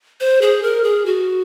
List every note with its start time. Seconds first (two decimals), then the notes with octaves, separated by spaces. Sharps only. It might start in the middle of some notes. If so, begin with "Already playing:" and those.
0.21 C5
0.42 G#4
0.63 A#4
0.84 G#4
1.06 F#4